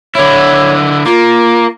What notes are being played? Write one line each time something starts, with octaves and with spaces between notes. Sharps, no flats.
D3 E4 C#5
A#3 F4